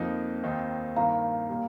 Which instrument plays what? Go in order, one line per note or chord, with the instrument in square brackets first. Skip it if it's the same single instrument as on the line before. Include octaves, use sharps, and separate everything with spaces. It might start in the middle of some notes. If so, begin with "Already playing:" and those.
Already playing: [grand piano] F2 F3 A#3 D#4 [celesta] C5
[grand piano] D#2 D#3 C4 D#4
[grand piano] G2 D#3 A#3 [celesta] F5 A#5
[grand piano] A#2 G3 A#3